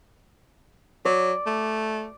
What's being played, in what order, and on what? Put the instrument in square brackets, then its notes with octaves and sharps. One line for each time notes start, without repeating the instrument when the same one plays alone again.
[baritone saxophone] F#3 [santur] D5
[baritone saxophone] A3